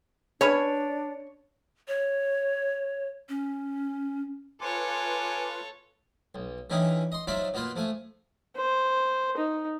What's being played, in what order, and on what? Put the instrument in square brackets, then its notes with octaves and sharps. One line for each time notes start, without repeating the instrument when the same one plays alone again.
[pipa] C#4 B4 G#5 [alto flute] D4 [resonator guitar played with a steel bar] C#5
[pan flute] C#5
C#4
[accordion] F4 B4 C6 [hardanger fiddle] A4 C#5 [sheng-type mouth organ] G#5 D6
[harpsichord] B1
D3 E3 C#4 D#4 E4 G4
D#5 C6
F#3 D#4 F4 C5 D5 E5
B2 A#3 F4 B4 C6
F3 A3 G#5
[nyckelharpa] C5
D#4